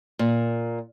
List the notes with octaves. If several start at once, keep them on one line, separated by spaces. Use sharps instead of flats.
A#2